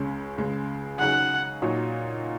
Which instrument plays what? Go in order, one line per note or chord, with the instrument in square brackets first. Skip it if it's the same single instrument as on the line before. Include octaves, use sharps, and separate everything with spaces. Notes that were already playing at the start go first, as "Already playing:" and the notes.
Already playing: [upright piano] C#2 C#3 G#3 C#4
C#2 C#3 G#3
[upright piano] C#3 F#3 D#4 G#4 [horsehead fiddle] F#5
[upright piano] A#2 F#3 D#4 F#4 C#5